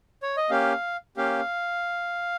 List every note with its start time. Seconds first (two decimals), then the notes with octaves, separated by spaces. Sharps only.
0.23 C#5
0.37 D#5
0.50 A#3 C#4 G4 F5
1.17 A#3 C#4 G4 F5